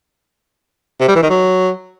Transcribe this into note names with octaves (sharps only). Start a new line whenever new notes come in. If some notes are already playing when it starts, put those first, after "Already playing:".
C3
G3
E3
D#3
F#3